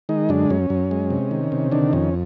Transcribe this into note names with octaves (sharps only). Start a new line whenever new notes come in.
D#3 G#3 D#4
F#2 D3 D4
F#2 C#4
F#2
G#3
C3
D#3
C3
D3 D#3 D4
F2 C#4